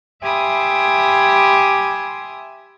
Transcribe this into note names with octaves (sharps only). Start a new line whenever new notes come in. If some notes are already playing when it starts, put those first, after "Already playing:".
G4 E5 G#5 B5 C6 D#6